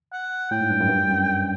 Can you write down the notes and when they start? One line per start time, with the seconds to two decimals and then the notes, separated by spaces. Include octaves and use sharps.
0.13 F#5
0.51 A2 G5
0.61 G#2
0.70 G2
0.80 F#2
0.89 G2
1.09 F#2